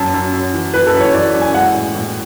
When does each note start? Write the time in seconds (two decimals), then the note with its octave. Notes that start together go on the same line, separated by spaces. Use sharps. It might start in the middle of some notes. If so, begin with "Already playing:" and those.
Already playing: F#2 A5
0.14 F#2
0.33 F#2
0.53 E3
0.74 E3 B4
0.87 A4
0.94 F#2
1.01 C#5
1.13 E3 D5
1.34 F#2
1.42 G#5
1.54 G#3 F#5
1.75 A2
1.95 A2